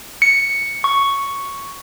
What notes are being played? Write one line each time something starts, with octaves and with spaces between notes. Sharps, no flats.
C#7
C#6